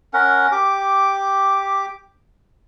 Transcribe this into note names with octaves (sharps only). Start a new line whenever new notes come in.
C#4 A#4 F#5
G4 D6